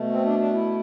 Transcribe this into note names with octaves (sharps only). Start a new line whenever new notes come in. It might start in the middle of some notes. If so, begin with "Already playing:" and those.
Already playing: B2 A3
C4
D4
D4
E4